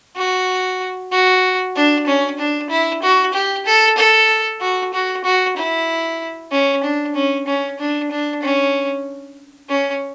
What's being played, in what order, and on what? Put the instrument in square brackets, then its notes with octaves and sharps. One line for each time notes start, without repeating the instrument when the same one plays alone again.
[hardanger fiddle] F#4
F#4
D4
C#4
D4
E4
F#4
G4
A4
A4
F#4
F#4
F#4
E4
C#4
D4
C#4
C#4
D4
D4
C#4
C#4